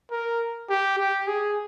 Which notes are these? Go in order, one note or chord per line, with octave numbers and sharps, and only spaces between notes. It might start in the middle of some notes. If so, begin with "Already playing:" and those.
A#4
G4
G4
G#4